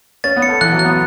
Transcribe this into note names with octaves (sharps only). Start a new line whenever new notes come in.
C#4 A6
B3
C#7
A3
E3 F#6
F#3
F#6
B3